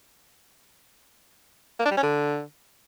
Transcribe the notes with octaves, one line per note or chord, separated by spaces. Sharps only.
A#3
D4
G3
C#4
D3